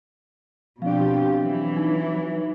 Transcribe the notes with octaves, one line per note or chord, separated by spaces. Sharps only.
B2 F3 C4 D4 F4 G4 F5
E3 F#3
D#4